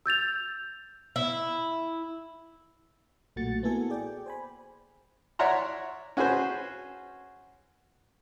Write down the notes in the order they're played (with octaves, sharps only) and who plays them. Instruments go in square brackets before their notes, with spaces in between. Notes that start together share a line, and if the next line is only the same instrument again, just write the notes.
[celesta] E6 G6 A6 F7
[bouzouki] E4
[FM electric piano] B1 A#2 A3 F#4 A6 C#7
A#3 B3 E4 F#4 A4 G#5
G#4 D5 G5
C5 G#5 B5
[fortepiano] C#5 D5 E5 F#5 A#5 C6
C#4 F#4 G#4 B4 C5